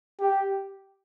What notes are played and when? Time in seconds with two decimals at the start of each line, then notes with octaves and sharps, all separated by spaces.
0.20 G4